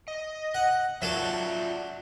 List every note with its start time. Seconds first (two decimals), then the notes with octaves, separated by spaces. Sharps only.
0.08 D#5
0.55 F#5
1.02 F#3 F4 A4 D5 E5